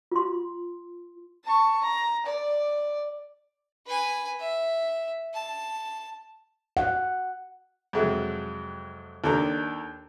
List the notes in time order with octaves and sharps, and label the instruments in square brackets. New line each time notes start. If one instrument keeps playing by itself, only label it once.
[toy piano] F4 C6
[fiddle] A5 C#6
A#5
D5
[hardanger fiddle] B4 G#5
E5
A5
[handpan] F#5
[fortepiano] F2 C3 F#3 G#3
D#2 D#3 D4 A4 A#5